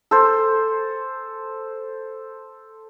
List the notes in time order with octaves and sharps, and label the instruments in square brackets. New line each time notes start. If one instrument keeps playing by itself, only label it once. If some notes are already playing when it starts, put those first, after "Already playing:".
[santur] A4 C5